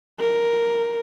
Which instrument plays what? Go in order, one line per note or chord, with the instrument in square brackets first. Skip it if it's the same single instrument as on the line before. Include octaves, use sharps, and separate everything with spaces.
[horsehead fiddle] A#4